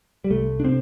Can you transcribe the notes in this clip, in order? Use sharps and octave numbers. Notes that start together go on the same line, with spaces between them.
G3
C2 A3
D4
C3 C4